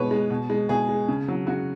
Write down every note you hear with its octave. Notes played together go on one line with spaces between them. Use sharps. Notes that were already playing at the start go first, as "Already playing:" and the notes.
Already playing: B2 G#3 B4 C#5
G#3
B2
G#3
B2 G#4
G#3
C#3
F#3
C#3 F#4